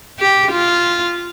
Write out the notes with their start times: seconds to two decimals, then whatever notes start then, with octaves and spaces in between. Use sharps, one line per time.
0.19 G4
0.51 F4